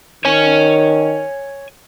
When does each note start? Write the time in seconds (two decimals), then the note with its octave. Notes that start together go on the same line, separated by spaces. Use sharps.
0.25 D#3 C#5 G#5